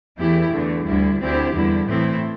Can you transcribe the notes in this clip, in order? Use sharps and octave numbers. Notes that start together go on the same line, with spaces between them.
E2 E3 A3 E4 G4
E2 D3 A3
D2 D3 G3 E4
D2 D3 C4 E4 G4
E2 D3 G3 E4
A2 E3 A3 C4 E4